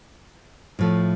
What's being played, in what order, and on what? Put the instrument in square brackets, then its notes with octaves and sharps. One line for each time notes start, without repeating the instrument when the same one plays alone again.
[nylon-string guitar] A2 F3 A3